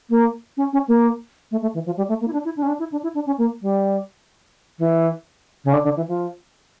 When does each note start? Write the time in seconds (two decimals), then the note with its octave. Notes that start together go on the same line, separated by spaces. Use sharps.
0.09 A#3
0.57 C#4
0.72 C#4
0.88 A#3
1.51 A3
1.61 A3
1.74 E3
1.86 F3
1.97 G3
2.08 A3
2.20 A#3
2.27 E4
2.32 D4
2.45 E4
2.56 D4
2.62 C#4
2.67 D4
2.79 E4
2.91 D4
3.03 E4
3.14 D4
3.26 C#4
3.38 A#3
3.61 G3
4.79 E3
5.64 C#3
5.73 D3
5.84 D3
5.96 E3
6.07 F3